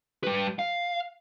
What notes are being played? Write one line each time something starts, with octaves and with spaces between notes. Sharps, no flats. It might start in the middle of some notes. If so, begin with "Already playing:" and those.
G3 B4
F5